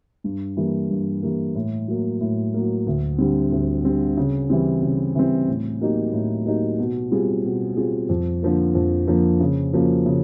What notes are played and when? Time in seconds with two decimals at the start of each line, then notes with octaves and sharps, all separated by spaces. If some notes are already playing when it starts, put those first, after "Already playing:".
0.24 G2
0.57 E3 G3 A#3
0.90 G2
1.22 E3 G3 A#3
1.55 A2
1.88 F#3 A#3
2.21 A2
2.54 F#3 A#3
2.86 D2
3.18 D3 G3 C4
3.52 D2
3.84 D3 G3 C4
4.17 C#3
4.50 E3 G3 C4
4.82 C#3
5.15 E3 G3 C4
5.48 A2
5.81 F#3 A#3 D#4 G4
6.13 A2
6.46 F#3 A#3 D#4 G4
6.79 B2
7.11 G3 C4 F4 G#4
7.45 B2
7.76 G3 C4 F4 G#4
8.09 F2
8.42 D3 F3 A#3
8.75 F2
9.08 D3 F3 A#3
9.40 C#3
9.73 F3 A#3 C#4 F#4
10.06 C#3